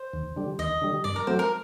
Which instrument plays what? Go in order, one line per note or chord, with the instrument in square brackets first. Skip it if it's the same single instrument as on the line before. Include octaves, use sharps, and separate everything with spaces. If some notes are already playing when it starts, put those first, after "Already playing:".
Already playing: [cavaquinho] C5
[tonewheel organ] D#2
D3 G3
[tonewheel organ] D#2 [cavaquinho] D#5
[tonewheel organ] D3 G3
[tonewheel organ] G2 [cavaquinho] D5
[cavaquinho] A#4
[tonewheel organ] F#3 A3 C4 [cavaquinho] C5
[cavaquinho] A#4